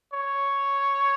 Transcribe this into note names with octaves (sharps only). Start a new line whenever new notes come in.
C#5